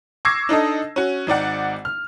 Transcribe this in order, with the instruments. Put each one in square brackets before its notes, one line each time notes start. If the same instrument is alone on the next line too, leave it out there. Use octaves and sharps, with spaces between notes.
[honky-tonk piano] C#6 D6 E6 G#6 A#6 C7
D4 D#4 A4 D#5
C#4 F#4
G#1 D#4 D5 F#5
F6